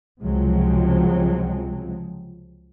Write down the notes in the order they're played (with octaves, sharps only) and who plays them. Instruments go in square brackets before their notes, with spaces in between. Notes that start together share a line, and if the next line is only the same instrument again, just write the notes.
[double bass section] C#2 C3 F3 F#3 G#3 C4